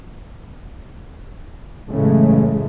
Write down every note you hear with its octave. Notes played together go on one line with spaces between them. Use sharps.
F#2 A2 C#3 E3 G#3 A3